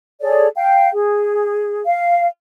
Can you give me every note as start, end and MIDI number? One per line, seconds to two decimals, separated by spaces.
0.21 0.47 68
0.21 0.47 69
0.21 0.47 73
0.21 0.47 74
0.56 0.89 77
0.56 0.89 79
0.93 1.82 68
1.85 2.27 77